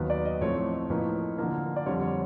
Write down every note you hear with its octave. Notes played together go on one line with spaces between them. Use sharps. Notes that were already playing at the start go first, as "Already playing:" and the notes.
Already playing: D#2 D#3 F#3 B3
D5
D#5
A2 F3 A3 C4 C#5
A2 F3 A#3 D#4 B4
D3 F3 A#3
D5
F2 D3 G3 C4 C#5
C#5